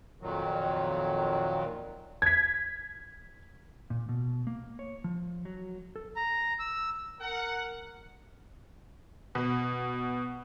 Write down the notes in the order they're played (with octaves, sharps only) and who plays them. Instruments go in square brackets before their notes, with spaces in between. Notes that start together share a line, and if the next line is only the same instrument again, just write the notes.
[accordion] F2 A#2 D#3 F#3
[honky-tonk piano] G#6 B6
[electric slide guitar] A#2
B2
A#3
C#5
F3
F#3
A4
[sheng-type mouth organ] A#5
E6
[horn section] A#4 F#5
[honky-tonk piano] B2